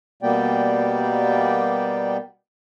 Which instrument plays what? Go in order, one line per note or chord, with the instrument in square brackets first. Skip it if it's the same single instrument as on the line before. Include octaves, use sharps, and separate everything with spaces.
[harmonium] B2 G3 A#3 B3 D5 G5